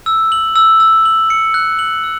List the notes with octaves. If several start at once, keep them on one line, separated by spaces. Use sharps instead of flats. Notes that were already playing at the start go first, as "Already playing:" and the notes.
E6
F#7
E6
E6
F#7
C#7
F#6
F#7
E6